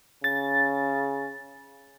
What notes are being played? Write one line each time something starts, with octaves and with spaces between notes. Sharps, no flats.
C#3 A6